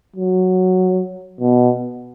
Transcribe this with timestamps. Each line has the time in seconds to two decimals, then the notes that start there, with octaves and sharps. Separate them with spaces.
0.16 F#3
1.41 B2